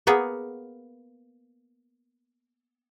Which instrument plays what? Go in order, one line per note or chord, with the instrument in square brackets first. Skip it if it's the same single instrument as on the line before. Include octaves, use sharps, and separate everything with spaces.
[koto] A#3 B3 G#4